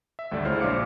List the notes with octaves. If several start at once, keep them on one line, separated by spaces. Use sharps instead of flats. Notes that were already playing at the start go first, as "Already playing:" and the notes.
E5
G#1 D2 G3 A3 D5
C#2 G#3 E4 C5 C#5 F6
A#1 D4 C5 F5 D6 C#7